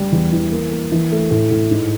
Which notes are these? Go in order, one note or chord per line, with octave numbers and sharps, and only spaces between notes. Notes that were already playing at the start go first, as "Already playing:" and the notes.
Already playing: G3
E2
E3
A#3
A#3
E3
A3
A2
A2
G#2